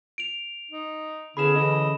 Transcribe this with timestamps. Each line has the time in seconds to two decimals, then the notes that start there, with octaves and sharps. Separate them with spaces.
0.18 D7 F7
0.71 D#4
1.37 D3 B3 C#4 E4 G#4 B5 E7
1.55 C#3 E3 D#5